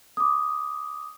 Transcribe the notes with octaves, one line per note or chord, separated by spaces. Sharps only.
D6 D#6